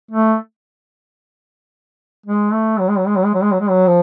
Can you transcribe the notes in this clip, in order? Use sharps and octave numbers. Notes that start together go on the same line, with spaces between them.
A3
G#3
A3
F#3
G#3
F#3
G#3
F#3
G#3
F#3
G#3
F#3
G#3
F#3
F3